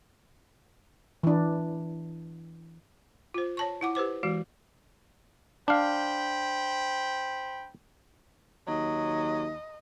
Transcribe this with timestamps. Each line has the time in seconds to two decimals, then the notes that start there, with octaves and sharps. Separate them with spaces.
1.23 E3 D4
3.34 F4 C5
3.57 C#5 A5 C#6
3.81 E4 F#5 D6
3.95 G4 B4 C5 D6
4.23 E3 G#3 F#4
5.68 D4 C5 F5 G5 B5
8.68 D#2 F#3 D#5